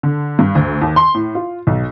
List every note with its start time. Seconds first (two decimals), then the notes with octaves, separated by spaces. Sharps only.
0.03 D3
0.39 G2
0.55 D2
0.82 D#2
0.96 C6
1.14 A2
1.35 F4
1.67 B1